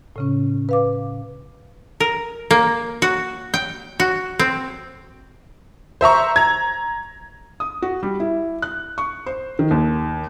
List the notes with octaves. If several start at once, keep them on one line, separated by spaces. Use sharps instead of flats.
A2 C#3 C#4
B4 F5 D6
A#4
A#3
F#4
G5
F#4
C4
C5 E5 A#5 C#6
A#5 G#6
D#6
F#4
G3
E4
F#6
C#6
C5
D#3
D#2